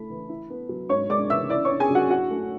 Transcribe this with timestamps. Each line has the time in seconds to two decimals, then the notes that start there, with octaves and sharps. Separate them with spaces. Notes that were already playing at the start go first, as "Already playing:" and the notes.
Already playing: A3 E4 B5
0.10 E3
0.29 E4
0.50 B3
0.69 F#3
0.89 G#2 C#5 C#6
1.09 G#3 D5 D6
1.30 E3 E5 E6
1.49 E4 D5 D6
1.65 C#5 C#6
1.70 C#4
1.79 G#4 G#5
1.90 F#3 F#4 F#5
2.10 E4 F#4 F#5
2.30 A3